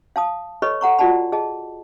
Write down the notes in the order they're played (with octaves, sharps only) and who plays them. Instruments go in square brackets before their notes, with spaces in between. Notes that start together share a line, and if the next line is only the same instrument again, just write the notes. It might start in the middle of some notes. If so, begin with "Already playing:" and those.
[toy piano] F5 A5 D#6
A4 B4 C#5 D#5 B5 C#6
A4 F#5 A#5 C#6
F4 F#4 D5 F#5 A5 B5
G#4 D#5 A5